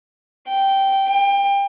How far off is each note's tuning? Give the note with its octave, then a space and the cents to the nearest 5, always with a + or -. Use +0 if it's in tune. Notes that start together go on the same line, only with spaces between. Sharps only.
G5 -10
G5 +25